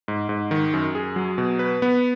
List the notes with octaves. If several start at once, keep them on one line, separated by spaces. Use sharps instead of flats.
G#2
G#2
D#3
F#2
G#4
F#3
B2
B4
B3